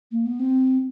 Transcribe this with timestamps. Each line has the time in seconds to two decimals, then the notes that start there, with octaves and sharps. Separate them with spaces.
0.12 A#3
0.26 B3
0.39 C4